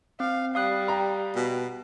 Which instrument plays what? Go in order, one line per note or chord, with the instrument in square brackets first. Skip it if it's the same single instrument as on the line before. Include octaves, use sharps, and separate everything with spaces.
[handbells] C4 [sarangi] F5
[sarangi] G3 [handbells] F5 D#6 F#6
[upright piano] G5 A#5
[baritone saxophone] B2